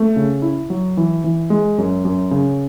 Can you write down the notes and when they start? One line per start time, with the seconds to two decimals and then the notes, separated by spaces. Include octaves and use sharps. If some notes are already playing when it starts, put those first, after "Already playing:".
Already playing: A3
0.16 C#3
0.42 E4
0.70 F#3
0.97 E3
1.24 E3
1.50 G#3
1.78 F#2
2.05 F#2
2.31 C#3